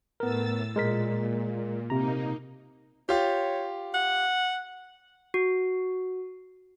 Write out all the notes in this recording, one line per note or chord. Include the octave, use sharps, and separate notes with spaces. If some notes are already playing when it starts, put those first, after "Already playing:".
A2 B3 A#4 E6 A6
A#2 G#3 A#4 B6
C3 A#3 D#4 A#5
F4 G4 C#5
F#5
F#4